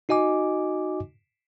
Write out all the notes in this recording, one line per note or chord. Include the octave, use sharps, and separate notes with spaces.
D#4 F#4 D#5 G#5 D6